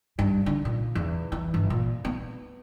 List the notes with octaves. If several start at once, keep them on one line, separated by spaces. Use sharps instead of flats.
G2
D3
A#2
E2
E3
G1
A#2
B3